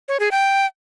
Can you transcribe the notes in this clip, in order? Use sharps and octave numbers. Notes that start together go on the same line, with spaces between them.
C#5
G#4
G5